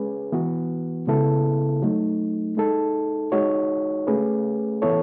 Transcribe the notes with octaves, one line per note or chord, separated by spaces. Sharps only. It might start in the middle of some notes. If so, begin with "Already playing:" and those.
Already playing: G#3 C#4 G#4 B4
E3 B3 F#4
C#3 G#3 B3 E4 A4
F#3 A3 D#4
G#3 D#4 A4
G#3 D#4 F#4 C#5
A3 C#4 G#4 B4
E3 B3 E4 A4 C#5